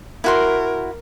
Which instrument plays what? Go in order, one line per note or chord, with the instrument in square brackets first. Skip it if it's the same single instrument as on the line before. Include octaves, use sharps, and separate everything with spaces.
[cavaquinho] E4 F#4 C6 [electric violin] A#4